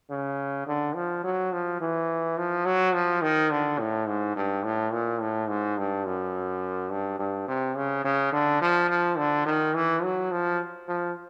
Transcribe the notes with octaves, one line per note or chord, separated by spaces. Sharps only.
C#3
D3
F3
F#3
F3
E3
F3
F#3
F3
D#3
D3
A2
G#2
G2
A2
A#2
A2
G#2
G2
F#2
G2
G2
C3
C#3
C#3
D3
F3
F3
D3
D#3
E3
F#3
F3
F3